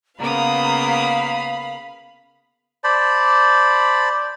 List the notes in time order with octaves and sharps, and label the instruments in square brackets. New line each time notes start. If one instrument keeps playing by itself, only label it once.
[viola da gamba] C#3 B3 [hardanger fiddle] A#3 D#6 [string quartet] F5 B5 [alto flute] A#5
[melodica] C5 D5 A5 B5